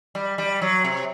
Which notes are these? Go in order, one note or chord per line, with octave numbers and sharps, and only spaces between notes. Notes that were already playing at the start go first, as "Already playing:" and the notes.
G3
G3
F#3
C3